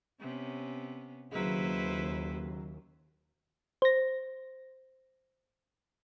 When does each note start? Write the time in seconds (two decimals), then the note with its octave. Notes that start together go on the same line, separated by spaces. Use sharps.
0.20 C3 B3 C#4
1.32 D#2 C#3 F#3 E4 B4 C5
3.82 C5 A#6